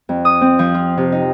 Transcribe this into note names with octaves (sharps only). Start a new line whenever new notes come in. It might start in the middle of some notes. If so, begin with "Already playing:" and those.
F2
D#6
C4
F3
F4
C3
D#4